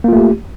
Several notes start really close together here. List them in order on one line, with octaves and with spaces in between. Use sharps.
A#3 F4 A3 G4